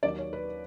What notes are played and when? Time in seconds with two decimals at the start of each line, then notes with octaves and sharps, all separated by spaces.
0.03 D#2 D#3 F#3 D5
0.19 C#5
0.33 B4